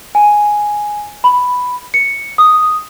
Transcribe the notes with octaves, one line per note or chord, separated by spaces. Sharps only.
G#5
B5
C#7
D#6